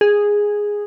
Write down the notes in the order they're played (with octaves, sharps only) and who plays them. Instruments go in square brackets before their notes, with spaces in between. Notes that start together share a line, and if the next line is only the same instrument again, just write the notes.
[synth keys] G#4